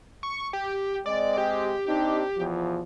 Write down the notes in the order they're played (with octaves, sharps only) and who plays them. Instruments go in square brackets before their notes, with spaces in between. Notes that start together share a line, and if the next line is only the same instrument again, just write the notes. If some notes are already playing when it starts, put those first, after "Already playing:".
[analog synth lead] C#6
G4
[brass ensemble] G#3 C4 D#5 [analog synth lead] D5
[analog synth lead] G4
[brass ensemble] C4 D4 D#4
E2 B2 F3